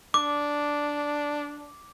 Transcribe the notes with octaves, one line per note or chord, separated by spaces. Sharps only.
D4 D6